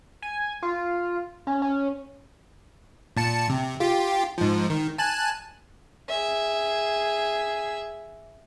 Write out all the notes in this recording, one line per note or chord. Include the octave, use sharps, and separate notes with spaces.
G#5
F4
C#4
C#4
A#2 A5 C#7
C3
F4 G4
G#2 F3
D#3
G#5 A5 F#6
G#4 E5